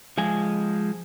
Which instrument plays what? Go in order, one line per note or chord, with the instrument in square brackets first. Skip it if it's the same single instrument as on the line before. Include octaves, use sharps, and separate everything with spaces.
[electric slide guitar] F3 G#3 G#5